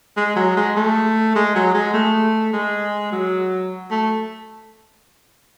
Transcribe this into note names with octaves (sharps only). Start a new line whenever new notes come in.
G#3
F#3
G#3
A3
G#3
F#3
G#3
A3
G#3
F#3
A3